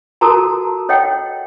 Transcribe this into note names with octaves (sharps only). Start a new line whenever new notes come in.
F#4 A4 A#4 A5 A#5
A4 C#5 D#5 F#5 G5